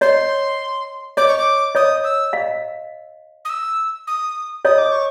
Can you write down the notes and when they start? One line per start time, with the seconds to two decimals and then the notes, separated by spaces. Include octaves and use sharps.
0.01 C#5 D#5 C6
1.17 C#5 D#5 D6
1.28 C#6
1.38 D6
1.75 C#5 D#5 D#6
2.04 E6
2.33 D#5 F5
3.45 D#6
3.49 E6
4.07 D#6
4.65 C#5 D#5 D#6
4.78 D6
4.92 C#6